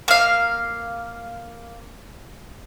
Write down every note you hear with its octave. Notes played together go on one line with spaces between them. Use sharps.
A#3 F5